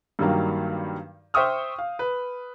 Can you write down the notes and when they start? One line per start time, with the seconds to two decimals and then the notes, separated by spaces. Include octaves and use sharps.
0.19 G2 D#3 F#3 G3 A#3 F5
1.34 C5 E5 G5 C#6 D#6 F6
1.79 F5
1.99 B4